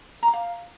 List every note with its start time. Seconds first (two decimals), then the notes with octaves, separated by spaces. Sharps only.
0.23 A#5
0.28 D6
0.33 F5